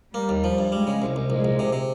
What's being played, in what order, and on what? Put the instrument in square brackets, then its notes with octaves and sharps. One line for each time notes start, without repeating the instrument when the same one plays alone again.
[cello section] G3 [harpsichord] A#3
[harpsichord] D#2
F3
G2
[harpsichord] G3 [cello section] G#3
[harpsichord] C#3
C2
C2
[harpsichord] A#1 [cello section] G#3
[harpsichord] A#1
C3
C3